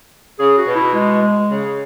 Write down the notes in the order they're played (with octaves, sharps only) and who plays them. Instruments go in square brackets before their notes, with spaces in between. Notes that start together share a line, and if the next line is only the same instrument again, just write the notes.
[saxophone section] C#3 [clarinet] G#4
[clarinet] F#4
[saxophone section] B2
[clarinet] E4
G#3
G#3
[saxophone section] C#3